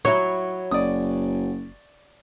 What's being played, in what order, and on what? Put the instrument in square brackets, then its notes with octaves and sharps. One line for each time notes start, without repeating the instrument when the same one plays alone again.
[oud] F#3 E4 [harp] C#5
[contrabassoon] F#1 [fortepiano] D5 D#6